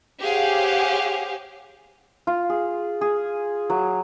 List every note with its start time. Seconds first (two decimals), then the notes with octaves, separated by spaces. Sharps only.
0.22 G4 G#4 C5 C#5 F5 F#5
2.27 F4
2.50 G#4
3.01 G#4
3.70 F#3